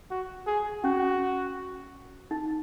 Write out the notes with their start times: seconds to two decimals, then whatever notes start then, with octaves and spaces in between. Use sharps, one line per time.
0.10 F#4
0.47 G#4
0.84 C#4 F#4
2.31 D#4